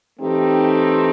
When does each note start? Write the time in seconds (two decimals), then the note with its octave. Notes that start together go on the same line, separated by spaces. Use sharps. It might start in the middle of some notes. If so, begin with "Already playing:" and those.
0.20 E3 A3 C4 D#4 G4